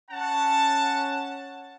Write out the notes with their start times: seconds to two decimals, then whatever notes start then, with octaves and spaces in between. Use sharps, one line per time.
0.11 C#4 F#5 A5